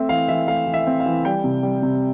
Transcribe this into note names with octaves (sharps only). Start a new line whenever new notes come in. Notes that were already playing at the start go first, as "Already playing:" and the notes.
Already playing: A3 C4 E5
E3 F5
E3 E5
A3 F5
E3
E5
C4
F5
E3
G3 G5
C3
G3
C3